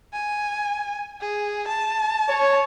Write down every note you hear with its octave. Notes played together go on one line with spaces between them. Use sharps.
G#5
G#4
A5
C#5